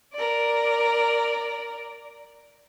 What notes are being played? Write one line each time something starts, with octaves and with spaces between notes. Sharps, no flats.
A#4 D5